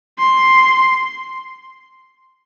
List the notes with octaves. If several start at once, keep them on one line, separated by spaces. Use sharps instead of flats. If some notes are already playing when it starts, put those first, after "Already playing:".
C6